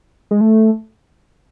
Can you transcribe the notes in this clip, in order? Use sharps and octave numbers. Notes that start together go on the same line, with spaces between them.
G#3
A3